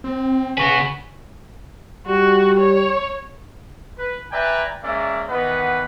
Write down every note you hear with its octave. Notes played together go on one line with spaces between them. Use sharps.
C4
C#3 F#4 B4 G#5 C#6 B6
G3 F#4
C#5
B4
B4 D5 E5 G5 G#5 A#5
G#3 A#3 C#4 D5 E5
D#3 E3 B3 B4 D#5 F#5